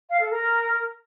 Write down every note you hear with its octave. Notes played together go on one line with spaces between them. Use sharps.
F5
A4
A#4